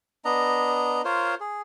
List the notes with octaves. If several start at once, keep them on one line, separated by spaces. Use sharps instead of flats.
B3 D4 D#5 A#5
F4 A#4 C5 C#5
G#4